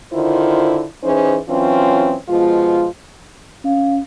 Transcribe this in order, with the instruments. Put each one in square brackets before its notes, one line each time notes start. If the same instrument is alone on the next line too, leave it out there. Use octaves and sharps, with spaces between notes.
[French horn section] D3 D#3 E4 F4 C5
E3 C#4 D#4 G#4 C5
E3 F#3 C4 C#4 F4
B2 F3 G#3 F4
[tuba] C#4 [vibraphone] F5